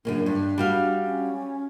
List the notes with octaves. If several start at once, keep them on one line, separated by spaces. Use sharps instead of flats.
F#2 C#3 A#3 D4
G2
G3 F#4 F5
C#4